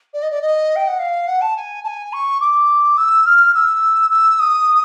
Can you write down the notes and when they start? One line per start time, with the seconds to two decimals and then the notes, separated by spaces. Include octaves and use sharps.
0.14 D5
0.23 D#5
0.31 D5
0.42 D#5
0.76 G5
0.87 F#5
0.99 F5
1.27 F#5
1.41 A5
1.56 G#5
1.84 A5
1.87 G#5
2.13 C#6
2.41 D6
2.98 E6
3.26 F6
3.54 E6
4.11 E6
4.40 D#6